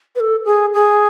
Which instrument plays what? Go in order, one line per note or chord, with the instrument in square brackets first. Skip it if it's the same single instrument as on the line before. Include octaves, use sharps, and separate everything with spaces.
[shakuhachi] B4
A4
G#4
G#4